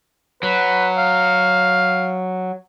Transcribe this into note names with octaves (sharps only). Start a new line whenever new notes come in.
F#3 B4
F5